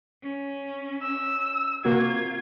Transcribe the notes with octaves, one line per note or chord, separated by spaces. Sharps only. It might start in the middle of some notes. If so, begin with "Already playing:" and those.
C#4
E6
C3 A#3 F4 F#4 G#6